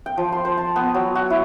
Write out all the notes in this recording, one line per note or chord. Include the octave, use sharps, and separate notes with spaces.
G5
F3
C6
C5
A5
B3
F#3
F#4
E4